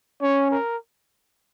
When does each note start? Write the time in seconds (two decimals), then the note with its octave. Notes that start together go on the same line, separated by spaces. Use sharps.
0.22 C#4 C#5
0.51 A#4